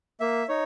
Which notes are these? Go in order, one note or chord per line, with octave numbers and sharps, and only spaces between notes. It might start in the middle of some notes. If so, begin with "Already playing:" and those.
A#3 E5
D#4 C#5